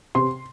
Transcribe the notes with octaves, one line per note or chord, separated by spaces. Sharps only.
C3 C6